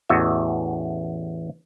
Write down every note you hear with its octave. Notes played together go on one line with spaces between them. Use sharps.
A1 E2 F#4 D#5 E5